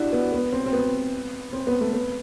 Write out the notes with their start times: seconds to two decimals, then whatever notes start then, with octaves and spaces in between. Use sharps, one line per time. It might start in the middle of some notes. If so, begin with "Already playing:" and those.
Already playing: D4 E4 F#4 G4
0.13 B3
0.33 B3
0.53 C4
0.66 C4
0.73 B3
1.53 C4
1.67 B3
1.81 A3
1.93 B3